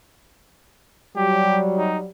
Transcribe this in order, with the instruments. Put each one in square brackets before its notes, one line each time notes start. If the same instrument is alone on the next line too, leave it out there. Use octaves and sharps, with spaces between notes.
[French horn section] F#3 G3 [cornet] G4
[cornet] D#4